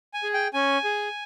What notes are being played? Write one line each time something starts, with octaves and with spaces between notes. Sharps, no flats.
G#5
G#4
G5
C#4 G#5
G#4